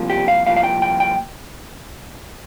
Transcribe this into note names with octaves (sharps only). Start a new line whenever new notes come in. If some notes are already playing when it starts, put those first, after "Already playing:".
Already playing: C2 A#2 F3
G4
F5
C2 A#2 F3 F5
F5
G5
G5
G5